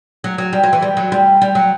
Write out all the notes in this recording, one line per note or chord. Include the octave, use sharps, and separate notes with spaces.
F#3
F#3
G3
F#3
E3
G3
F#3
G3
G3
F#3